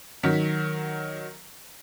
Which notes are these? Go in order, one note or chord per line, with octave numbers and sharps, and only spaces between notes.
D#3 F#3 B6